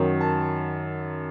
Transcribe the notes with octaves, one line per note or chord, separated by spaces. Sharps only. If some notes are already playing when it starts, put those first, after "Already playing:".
Already playing: F#2 D#3 F#3
A5